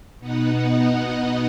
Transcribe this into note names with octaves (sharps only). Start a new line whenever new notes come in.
B2 B3 D#4 F#5
D#5